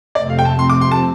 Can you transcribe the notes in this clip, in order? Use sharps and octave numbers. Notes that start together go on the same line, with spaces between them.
F2 C3 A3 C4 D5
F5
G5
A5
C6
D6
C6
A5